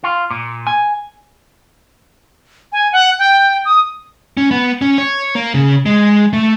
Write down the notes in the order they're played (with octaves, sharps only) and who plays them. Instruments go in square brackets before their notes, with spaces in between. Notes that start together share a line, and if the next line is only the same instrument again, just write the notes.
[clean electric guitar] F4
A#2
G#5
[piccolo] G#5
F#5
G5
D#6
[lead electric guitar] C#4
B3
C#4
C#5
A#3
C#3
G#3
A3